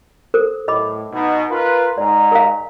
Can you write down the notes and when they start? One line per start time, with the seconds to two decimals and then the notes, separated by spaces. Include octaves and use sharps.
0.34 A4 A#4 C5
0.68 A2 D#5 B5 D6
1.12 B2 D#4
1.50 F4 A#4 B4
1.98 G#2 D5 A#5
2.32 A#4 F5